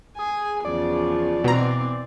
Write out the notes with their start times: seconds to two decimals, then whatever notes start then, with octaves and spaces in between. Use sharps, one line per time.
0.19 G#4 G#5
0.65 E2 C#3 F3 D5
1.44 B2 E3 C4 A#5